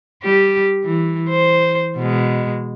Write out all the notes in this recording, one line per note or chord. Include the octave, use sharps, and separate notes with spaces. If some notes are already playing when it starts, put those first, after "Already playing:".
G3 G4
E3
C5
B2 G#3